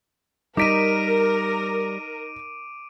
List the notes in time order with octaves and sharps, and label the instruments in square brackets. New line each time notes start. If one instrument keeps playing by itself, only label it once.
[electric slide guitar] G3 [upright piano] D#4 B6 [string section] A#4 [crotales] D6 D7 D#7